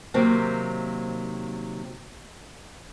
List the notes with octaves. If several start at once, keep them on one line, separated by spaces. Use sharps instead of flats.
C3 D#3 F#3 A#3 C4